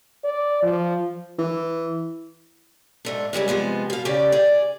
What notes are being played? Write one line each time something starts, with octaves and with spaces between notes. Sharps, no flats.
D5
F3
E3
G#2 A3 D4
F#2 C#3 G3 G#3
C3 F3 G#3 B3
B2 F5
C#3 C#4 G4 D5
G#4 D5